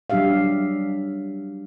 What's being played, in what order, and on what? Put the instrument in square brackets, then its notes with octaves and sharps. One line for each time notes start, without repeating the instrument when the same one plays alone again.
[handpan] F#3 G3 D4 G4 E5 F5